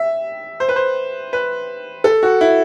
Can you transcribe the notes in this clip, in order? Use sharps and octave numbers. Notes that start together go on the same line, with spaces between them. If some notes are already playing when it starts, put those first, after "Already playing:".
Already playing: E5
C5
B4
C5
B4
A4
F#4
E4